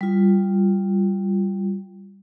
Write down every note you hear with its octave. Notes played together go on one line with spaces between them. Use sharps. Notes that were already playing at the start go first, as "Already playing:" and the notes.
G3 F4